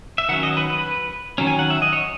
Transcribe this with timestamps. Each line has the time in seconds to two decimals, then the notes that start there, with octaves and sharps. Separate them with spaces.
0.18 E5
0.29 D#3 F#3 C#4 F#5
0.43 D#5
0.57 B4
0.70 B4
1.38 D#3 F#3 C#4
1.47 G#5
1.59 F#5
1.70 E5
1.82 D#5
1.93 C#5